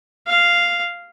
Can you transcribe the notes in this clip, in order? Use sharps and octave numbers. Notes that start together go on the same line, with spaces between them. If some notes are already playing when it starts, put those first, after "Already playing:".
F5